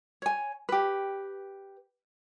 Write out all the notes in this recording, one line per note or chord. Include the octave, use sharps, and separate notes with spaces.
C#5 G#5
G4 B4